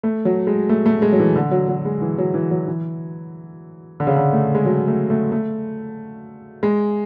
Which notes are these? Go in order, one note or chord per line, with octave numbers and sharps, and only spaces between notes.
A3
F#3
G#3
A3
A3
G#3
F#3
E3
D3
F#3
F#3
G#3
E3
F#3
E3
F#3
E3
D3
C#3
D3
A3
G#3
F#3
A3
A3
A3
G#3